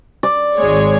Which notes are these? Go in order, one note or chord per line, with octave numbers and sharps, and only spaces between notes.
D5
G#1 G#3 C#5